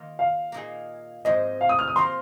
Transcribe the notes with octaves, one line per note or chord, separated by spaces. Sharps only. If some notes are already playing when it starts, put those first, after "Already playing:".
Already playing: D#3 A#3 F4
F5
A#2 A#3 D#4 G#4
G#2 F3 C4 G#4 D#5
F5
D#6
F6
D#6
F3 A#3 F4 A#4 C6